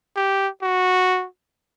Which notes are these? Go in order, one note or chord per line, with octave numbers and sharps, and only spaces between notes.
G4
F#4